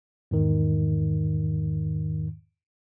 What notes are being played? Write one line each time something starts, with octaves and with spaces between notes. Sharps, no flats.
E2 G#2 D#3